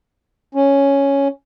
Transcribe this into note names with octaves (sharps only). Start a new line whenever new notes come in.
C#4